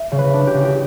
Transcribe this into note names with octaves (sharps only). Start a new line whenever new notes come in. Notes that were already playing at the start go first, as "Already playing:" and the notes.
Already playing: E5
C#3
B4
D4
G4
C#3
G4